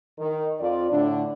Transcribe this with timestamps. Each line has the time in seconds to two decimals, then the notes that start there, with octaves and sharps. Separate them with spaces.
0.19 D#3
0.60 F2 F4 D5
0.91 A2 D3 D4